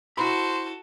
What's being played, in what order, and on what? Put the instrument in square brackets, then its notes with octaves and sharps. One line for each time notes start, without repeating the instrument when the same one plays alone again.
[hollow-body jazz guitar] E4 A#5 B5 [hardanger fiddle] F#4 A4 [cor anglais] C5